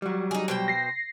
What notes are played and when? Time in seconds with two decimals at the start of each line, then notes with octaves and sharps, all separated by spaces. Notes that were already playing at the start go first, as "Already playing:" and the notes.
0.02 F#3 G3
0.31 D#4 G#4
0.48 B2 C5 G5
0.68 A#6 C7